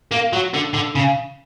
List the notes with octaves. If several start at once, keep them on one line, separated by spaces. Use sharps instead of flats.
A#3
F#3
D3
D3
C#3